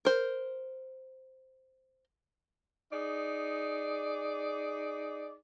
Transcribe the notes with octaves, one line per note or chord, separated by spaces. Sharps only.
A#4 C5
D#4 G#4 D5